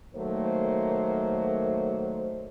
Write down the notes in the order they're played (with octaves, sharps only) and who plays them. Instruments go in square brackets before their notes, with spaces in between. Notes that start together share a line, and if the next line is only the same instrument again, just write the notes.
[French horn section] D#3 F#3 A3 A#3 C5